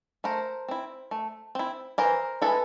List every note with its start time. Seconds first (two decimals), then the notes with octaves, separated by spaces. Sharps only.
0.24 A3 A#4 C5
0.68 C4 E4
1.11 A3
1.55 C4 E4
1.98 E3 A#4 C5
2.42 G#3 C#4 E4 A4 B4